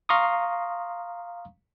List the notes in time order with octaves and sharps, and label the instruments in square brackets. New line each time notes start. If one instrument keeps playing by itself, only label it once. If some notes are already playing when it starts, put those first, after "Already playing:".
[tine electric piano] F5 A#5 C6 C#6 D#6